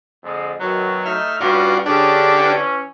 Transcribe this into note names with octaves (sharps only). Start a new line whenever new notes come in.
F2 D3 G#3
F#2 B2 D#3 F#3
A3 D#4 E5 F6
E2 G2 C#4 F4 F#4 D5
D3 C#4 D4 G4 G#4 D5
E3 C#4